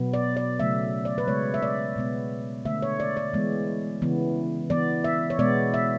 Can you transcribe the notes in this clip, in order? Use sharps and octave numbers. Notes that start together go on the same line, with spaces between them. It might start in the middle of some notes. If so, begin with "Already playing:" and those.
Already playing: B2 F#3 B3
D5
D5
C#3 F#3 A3 E5
D5
B4
C#3 G#3 B3 C#5
E5
D5
B2 G#3 B3
D3 A3 E5
C#5
D5
D5
E3 G#3 B3
C#3 E3 B3
E3 B3 D5
E5
C#5
B2 G#3 B3 D5
E5